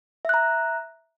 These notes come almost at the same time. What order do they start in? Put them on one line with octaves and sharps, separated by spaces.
E5 F#6 A#5